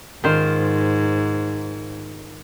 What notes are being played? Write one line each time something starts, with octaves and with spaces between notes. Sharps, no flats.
G#2 D#3 F4 C5